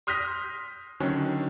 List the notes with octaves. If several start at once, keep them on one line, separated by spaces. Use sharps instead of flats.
C6 D#6 F6 G6 A#6 B6
D3 D#3 F#3 C#4